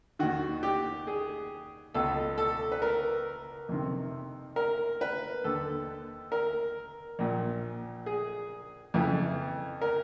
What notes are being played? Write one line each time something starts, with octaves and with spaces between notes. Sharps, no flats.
D#2 D#3 F#4
G4
G#4
C#2 B2 A4
A4
B4
A#4
F2 C3 D#3
A#4
B4
D#2 D3 A4
A#4
A#1 A#2
G#4
F2 C#3 E3
A#4